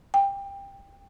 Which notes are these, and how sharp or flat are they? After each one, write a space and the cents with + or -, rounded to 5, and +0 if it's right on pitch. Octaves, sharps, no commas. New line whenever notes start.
G5 +20